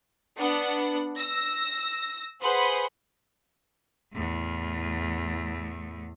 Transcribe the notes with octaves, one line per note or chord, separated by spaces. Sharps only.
B3 D4 F#5
E6 A#6
G#4 B4 C5 F#5 B5 C6
E2 A2